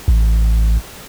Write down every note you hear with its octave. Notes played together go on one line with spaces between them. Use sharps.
A1